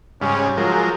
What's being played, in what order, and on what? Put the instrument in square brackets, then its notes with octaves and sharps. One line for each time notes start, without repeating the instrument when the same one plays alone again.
[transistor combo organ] G#2 C#3 G3 [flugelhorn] C#4
[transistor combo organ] F3 G#3 A#4 [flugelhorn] F#3